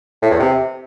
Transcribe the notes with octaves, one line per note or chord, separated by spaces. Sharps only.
A2
E2
C3